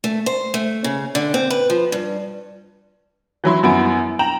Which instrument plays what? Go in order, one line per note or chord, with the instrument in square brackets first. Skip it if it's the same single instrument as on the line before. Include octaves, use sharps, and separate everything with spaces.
[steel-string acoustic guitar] A3
C5
A3
C#3
D3
C4
B4
F3
G2
[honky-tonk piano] E3 F#3 E4 C6
F#2 B3 E4 D7
G5 A#5 E7 F#7